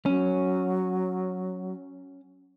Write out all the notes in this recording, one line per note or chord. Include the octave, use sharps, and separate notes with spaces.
F#3 C#4